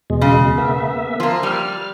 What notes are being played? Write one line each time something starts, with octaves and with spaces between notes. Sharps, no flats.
E2 B2 G#3
C#3
A#3 B3 E5
F3 A#3
G3 F6